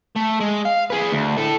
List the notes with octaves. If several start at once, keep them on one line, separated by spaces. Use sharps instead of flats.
A3
G#3
F5
G#4 B4
D2
A2 A4